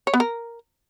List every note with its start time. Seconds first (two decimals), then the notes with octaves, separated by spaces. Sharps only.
0.07 C#5
0.14 B3
0.20 A#4